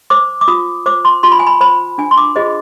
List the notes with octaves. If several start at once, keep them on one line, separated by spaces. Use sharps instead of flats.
C5 D6
D6
F4 D#6
C5 D6
C6
F4 C6
B5
G#5
B5
C5 B5
D4 G#5
C6
D6
F4 G#4 C5 D#5